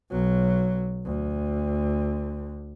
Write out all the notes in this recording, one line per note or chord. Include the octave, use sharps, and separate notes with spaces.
B1 F#3
D2